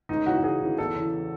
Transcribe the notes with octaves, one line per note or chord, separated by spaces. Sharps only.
C#2 D#4
C#3 E3 F#4
F#4
C#2 G#4
C#3 E3
E2 A4
C#3 E3